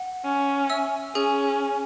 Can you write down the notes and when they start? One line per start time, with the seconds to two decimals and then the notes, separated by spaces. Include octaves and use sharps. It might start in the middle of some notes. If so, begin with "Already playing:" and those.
Already playing: F#5
0.25 C#4
0.70 E5 E6
1.15 C#4 G#4 G#5